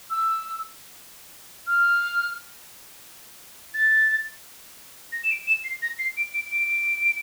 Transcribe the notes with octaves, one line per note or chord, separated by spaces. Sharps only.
E6
F6
A6
A#6
E7
D7
E7
C7
A#6
C7
D7
D7
D7